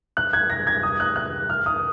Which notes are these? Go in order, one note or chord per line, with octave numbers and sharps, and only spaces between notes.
F#6
G#6
A#6
G#6
D#6
F#6
F#6
F6
D#6